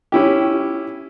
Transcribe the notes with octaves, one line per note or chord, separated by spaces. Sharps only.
C#4 E4 G4